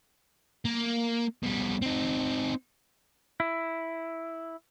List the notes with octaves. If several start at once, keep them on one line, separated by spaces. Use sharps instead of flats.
A#3
B2 G3
C4 D#4
E4